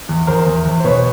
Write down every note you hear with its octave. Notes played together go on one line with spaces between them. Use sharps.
E2
E2 A#4 C5
E2
E2
C5
B2 B4 C#5